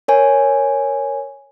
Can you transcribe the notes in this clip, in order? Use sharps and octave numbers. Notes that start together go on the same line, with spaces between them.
A#4 C#5 G#5